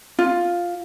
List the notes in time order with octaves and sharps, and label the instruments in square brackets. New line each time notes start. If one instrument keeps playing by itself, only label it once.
[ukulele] F4